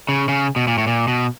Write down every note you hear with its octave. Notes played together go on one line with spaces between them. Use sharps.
C#3
C#3
B2
A#2
A2
A#2
B2